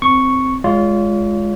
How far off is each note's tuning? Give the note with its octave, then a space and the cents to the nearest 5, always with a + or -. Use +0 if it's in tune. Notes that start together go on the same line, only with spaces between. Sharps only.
C4 -5 C#6 +0
G#3 +0 F4 +0 C#5 +40